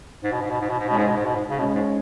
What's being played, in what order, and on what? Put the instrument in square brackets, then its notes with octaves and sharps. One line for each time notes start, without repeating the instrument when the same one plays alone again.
[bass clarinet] G#2
B2
G#2
B2
G#2
B2
G#2
[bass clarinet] B2 [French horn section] G#3 C#4
[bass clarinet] G#2
B2
G#2
B2
G#2
C#3
[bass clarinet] B2 [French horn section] G#3 C#4
[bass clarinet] G#2